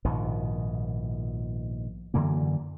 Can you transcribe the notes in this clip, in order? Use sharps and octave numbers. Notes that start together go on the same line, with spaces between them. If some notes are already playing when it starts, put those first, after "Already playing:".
A#1 G#2 B2 D#3
F#2 D3 E3 A#3